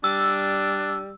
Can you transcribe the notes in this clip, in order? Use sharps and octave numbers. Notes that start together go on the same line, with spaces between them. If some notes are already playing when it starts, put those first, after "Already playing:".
G3 D4 E6